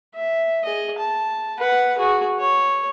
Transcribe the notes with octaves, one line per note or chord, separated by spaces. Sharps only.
E5
G#4 D#5
A5
B4 F#5
F#4 G#4
C#5